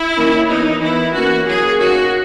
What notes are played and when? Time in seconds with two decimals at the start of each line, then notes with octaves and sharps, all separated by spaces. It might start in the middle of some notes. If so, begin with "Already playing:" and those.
Already playing: E4
0.16 D#3 A#3 C#4
0.49 E3 B3 D#4
0.81 E3 B3 E4
1.14 E3 A#3 C#4 F#4
1.46 F#3 A#3 C#4 G#4
1.79 D#3 A#3 C#4 F#4